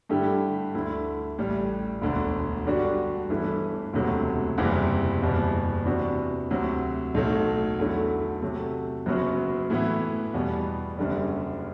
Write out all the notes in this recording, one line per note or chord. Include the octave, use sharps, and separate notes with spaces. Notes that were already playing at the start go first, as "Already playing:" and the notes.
G2 D3 A3 E4 G4
D2 D3 A3 E4
A1 A2 G3
E1 D2 D3
G2 D3 G3 D4 F#4
G1 G2 E3 A3 E4
E1 D2 C3 F#3 A3
F#1 E2 C3 E3 G3
F#1 E2 B2 G3
C3 E3 B3 D4 F#4
D2 C3 F#3
B1 A2 F#3 A3
E2 D3 F#3 A3 E4
C3 F#3 A3
F#1 F#2 F#3 B3 F#4
A2 E3 B3 E4
E2 B2 G3 B3
F#1 F#2 D3 G3